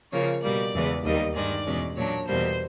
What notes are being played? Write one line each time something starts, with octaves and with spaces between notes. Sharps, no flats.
C#3 F3 A#3 C#5
B2 G3 A#3 D5
E2 C#3 E3 G#3 B3
D#2 D#3 G3 A#3 D#5
G2 D#3 G#3 D5
E2 B2 G#3 C#4
A#2 F#3 A#3 D4 C#5
E2 B2 G3 A#3 C5